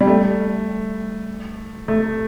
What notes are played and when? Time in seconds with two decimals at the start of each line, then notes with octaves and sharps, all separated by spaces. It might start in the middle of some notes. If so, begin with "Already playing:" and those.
0.01 G3
0.07 A3
1.88 A3